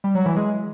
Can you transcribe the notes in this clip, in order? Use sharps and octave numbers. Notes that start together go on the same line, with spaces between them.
G3
F#3
E3
G#3